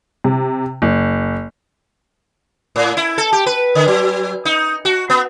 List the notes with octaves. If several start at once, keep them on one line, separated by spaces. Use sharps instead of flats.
C3
F#1
A2
E4
A4
G4
B4
D3
F#3
D#4
F#4
B3